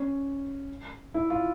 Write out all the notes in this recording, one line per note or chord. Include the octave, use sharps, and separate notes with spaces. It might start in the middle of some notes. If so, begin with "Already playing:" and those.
Already playing: C#4
E4
F4